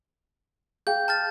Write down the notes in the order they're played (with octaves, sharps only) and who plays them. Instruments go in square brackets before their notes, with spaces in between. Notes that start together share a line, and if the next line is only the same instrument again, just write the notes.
[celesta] G#4 F5 G5 [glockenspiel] G6
[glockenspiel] A5 F6 A6